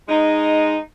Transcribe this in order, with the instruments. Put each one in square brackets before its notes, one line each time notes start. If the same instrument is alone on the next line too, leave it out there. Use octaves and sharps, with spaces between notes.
[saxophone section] G#3 D#4